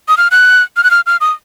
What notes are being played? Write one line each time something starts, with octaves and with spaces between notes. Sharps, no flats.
D#6
F6
F#6
F6
F#6
F6
F6
D#6